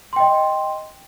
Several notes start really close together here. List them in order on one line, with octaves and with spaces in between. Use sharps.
C6 G5 D#5